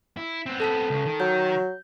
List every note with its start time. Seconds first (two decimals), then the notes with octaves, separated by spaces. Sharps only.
0.17 E4
0.46 B3 C4
0.60 A4 A5 B6
0.90 C#2 C#3
1.05 D#3
1.20 F#3 G6